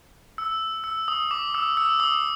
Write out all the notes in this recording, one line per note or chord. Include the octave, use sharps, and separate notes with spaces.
E6
E6
D#6
D6
E6
E6
D#6